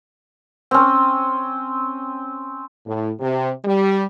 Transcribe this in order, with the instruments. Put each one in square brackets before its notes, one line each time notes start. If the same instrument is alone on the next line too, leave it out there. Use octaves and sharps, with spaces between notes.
[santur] C4 C#4
[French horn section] A2
C3
G3